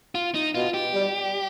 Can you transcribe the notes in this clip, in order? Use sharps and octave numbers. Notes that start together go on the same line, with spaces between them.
F4
D#4
B2 F4
G4
G3